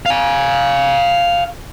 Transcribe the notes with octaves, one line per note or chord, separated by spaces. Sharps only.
F5 G#5